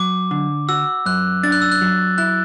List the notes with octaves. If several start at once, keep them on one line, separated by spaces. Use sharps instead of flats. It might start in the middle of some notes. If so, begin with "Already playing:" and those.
Already playing: F#3 D6
D3
F#4 E6
F#2 F#6
D4 A6
F#6
E6
F#6
F#3
E4 F#6